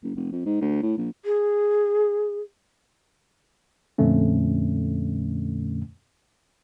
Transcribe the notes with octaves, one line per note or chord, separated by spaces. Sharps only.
F#1
F1
F2
G#2
D2
A2
A#1
G#4
F2 A#2 D3 A3 C#4